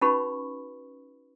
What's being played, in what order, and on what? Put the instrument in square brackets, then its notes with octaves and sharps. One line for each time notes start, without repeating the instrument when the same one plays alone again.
[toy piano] C#4 D#4 F#4 B4 B5 C#6